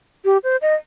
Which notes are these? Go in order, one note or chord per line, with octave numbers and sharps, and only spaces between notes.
G4
C5
D#5